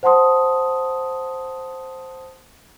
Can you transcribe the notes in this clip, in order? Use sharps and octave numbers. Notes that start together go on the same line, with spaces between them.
C5 F#5 A5 C6 D#6